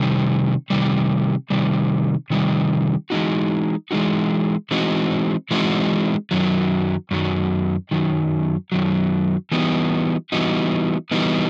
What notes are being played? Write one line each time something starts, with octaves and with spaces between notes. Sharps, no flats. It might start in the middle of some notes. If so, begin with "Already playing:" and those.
Already playing: C3 D#3 G3
C3 D#3 G3
C3 D#3 G3
C3 D#3 G3
E3 G#3 C4 D#4 F#4
E3 G#3 C4 D#4 F#4
E3 G#3 C4 D#4 F#4
E3 G#3 C4 D#4 F#4
F#2 D#3 F#3
F#2 D#3 F#3
F#2 D#3 F#3
F#2 D#3 F#3
E3 G3 B3 D#4 F#4
E3 G3 B3 D#4 F#4
E3 G3 B3 D#4 F#4